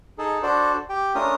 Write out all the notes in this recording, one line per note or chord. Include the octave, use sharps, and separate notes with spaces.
D#4 G#4 A4
D4 F#4 A4 C5 D5
G4 G5
A3 C#4 D4 F4 A#4 D#6